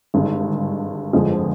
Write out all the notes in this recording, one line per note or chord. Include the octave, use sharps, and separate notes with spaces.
G#1 G2 D3 G#3
G1 F2 D3 F3 G#3